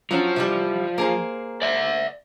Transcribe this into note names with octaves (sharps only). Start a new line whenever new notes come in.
F3 F#3 C#4
C3 E3 G3
A#3 G#4 C5
D5 E5